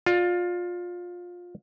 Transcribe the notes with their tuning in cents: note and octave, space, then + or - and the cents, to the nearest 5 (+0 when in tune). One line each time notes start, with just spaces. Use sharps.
F4 +20 D5 +15